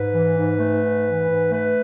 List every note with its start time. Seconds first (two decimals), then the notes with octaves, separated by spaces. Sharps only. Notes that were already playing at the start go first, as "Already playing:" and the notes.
Already playing: G#2 B4
0.14 E3
0.38 G#2
0.59 A3
0.83 G#2
1.06 E3
1.28 G#2
1.51 A3 B4